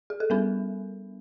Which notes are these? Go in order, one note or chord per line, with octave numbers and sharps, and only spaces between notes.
G#4
A4
G3 B3 D4 A#4